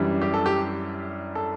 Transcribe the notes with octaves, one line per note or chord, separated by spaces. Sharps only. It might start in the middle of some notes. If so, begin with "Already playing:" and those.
Already playing: F#2 E3 G3 D4
G4
A4
G4
A4